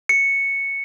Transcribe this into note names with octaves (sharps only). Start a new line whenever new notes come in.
C#7